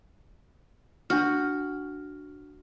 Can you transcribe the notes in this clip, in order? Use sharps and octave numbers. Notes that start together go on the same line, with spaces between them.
D4 F#4 F6